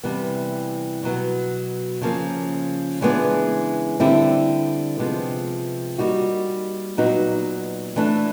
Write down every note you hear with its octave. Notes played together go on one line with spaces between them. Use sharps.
C3 E3 G3 B3
B2 F#3 B3
C#3 F3 A#3
C#3 E3 G#3 B3 D4
D3 G3 C4 E4
C3 F3 G#3 B3
G3 A#3 D#4 F#4
A#2 F#3 B3 D#4 F#4
E3 A3 D4